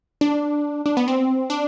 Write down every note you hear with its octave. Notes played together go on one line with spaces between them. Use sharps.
D4
D4
B3
C4
D4